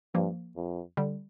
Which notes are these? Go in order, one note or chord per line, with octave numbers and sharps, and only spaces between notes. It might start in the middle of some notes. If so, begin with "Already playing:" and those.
G2 F3 A#3
F2
D3 G3